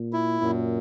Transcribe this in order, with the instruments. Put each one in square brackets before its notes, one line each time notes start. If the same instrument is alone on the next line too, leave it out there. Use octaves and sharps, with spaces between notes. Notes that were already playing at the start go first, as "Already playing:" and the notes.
Already playing: [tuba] A#2
[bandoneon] E4
[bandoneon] F#2 [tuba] A#2